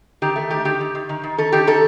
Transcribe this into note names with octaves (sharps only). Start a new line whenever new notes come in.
D#3 G4
A3
D#3 G4
D#3 G4
D#3
D#3
D#3
D#3
D#3 A4
D#3 G4
D#3 A4